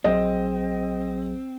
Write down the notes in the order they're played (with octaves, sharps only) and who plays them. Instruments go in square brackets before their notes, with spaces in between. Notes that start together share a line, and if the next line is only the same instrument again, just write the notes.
[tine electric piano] A#1 F#3 G#4 [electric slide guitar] C4 [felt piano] D#5